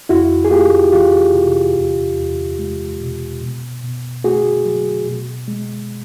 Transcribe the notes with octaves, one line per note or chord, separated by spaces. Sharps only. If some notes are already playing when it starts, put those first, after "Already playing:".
F2 E4 F#4
G#4
A3 F4 G4
E3 F4 G4
C3
E2
E2
G#3
B2
B2
B2
A3 F#4 G#4
F#3
B2
G#3